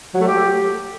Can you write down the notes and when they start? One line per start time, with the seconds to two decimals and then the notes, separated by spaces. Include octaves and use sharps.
0.14 F#3
0.21 A3
0.27 G4